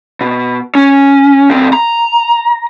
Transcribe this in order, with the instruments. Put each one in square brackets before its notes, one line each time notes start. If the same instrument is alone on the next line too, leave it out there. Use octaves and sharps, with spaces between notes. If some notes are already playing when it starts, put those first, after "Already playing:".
[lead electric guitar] B2
C#4
D2 C4
A#5